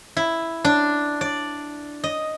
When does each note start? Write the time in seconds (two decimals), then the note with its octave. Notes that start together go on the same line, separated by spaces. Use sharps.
0.17 E4
0.64 D4
1.21 D5
2.04 D#5